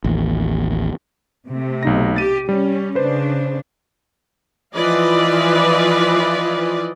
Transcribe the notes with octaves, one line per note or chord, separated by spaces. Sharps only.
A1 D#2
C3 A3
B1 D#4 A#6
G4 A6 D#7
G3 C#4
C#3 D4 B4 C5
E3 F3 F4 B4 D5 D#5